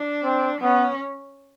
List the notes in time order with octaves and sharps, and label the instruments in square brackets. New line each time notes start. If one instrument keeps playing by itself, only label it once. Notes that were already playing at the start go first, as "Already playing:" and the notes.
Already playing: [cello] D4
[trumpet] C4
[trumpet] B3 [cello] C#4